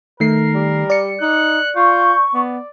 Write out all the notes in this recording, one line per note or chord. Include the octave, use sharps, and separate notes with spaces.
D#3 A3 A#4 C7
G3
D5 C#7
D#4 F#6
F4 C#6 G6
B3 D5